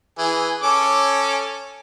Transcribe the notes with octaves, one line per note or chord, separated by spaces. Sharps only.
E3 G#4
C#4 A4 D6